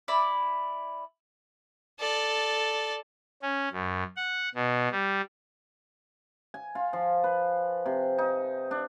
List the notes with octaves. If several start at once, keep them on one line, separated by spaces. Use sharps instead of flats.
E4 D5 B5
A4 D5
C#4
F#2
F#5
B2
G3
G#5
F4
F3
B4
C3
D#4
D4